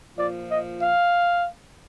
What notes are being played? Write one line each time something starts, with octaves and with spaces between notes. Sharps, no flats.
A#2 F3 D5
D#5
F5